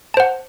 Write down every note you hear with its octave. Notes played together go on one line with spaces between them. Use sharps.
C5 F#5 A5